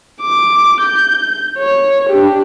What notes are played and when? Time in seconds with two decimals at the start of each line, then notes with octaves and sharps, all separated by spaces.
0.22 D6
0.81 G6
1.58 C#5
2.10 D4 G4